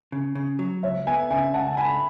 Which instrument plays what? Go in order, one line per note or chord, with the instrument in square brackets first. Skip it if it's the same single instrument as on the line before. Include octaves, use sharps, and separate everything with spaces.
[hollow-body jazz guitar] C#3
C#3
F#3
[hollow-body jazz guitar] C#2 [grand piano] C#5 E5
[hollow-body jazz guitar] B3 [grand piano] E5 G#5
[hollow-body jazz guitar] C#3 [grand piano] E5 G#5
[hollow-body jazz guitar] C#2 [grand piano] F#5 A5
[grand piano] A5
[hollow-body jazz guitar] C#2 [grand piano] G#5 B5